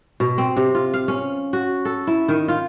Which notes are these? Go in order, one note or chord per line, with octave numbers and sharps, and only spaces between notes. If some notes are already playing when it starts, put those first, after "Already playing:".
B2
C4
C3
F4
F5
C#4
F#4
A4
E4
D#3
F4